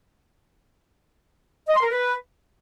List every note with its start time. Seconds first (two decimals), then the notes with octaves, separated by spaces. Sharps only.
1.68 D#5
1.76 C6
1.83 A#4
1.91 B4